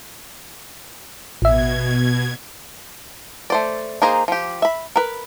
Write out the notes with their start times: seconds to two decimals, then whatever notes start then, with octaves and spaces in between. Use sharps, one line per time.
1.42 A1 B2 E5 G#6
3.50 A3 C5 D5
4.02 A#3 D#4 G#4 C5 A#5
4.28 F3 G4
4.62 E5 B5
4.96 A#4 B4